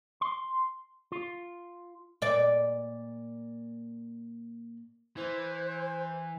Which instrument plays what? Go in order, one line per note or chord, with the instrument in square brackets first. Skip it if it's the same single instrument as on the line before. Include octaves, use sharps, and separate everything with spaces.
[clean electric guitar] C6
F4
[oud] A#2 D5
[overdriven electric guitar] E3 [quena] C5